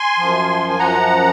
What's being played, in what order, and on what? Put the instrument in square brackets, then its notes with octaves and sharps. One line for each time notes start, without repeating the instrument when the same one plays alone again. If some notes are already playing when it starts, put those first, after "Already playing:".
Already playing: [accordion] G#5 C6
F#2 F3
G#5
F#2 F3 F#5 A#5